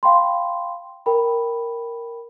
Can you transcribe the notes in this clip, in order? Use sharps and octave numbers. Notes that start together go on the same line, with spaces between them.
F5 G5 B5 C6
A#4 G5 B5